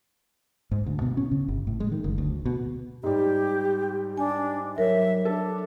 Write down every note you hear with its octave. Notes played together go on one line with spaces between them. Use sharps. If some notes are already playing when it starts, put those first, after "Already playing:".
G#2
D2
B2
C#4
C#3
G1
A2
G#3
D#3
F#1
D2
B2
G#2 G3 G4
D4 G#5
F#3 A#4 C#5 E5
D4 A4